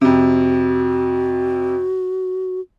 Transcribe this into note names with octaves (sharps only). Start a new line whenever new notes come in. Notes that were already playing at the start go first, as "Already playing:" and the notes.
F2 C3 F#4